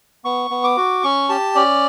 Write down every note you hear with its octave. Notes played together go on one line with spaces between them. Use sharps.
B3 C#6
B3
D6
F#4
C#4 C#6
G4 A5
C#4 D5